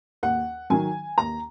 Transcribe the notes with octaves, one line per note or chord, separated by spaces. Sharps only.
D#2 F#5
D#3 F#3 G#5
D#2 A#5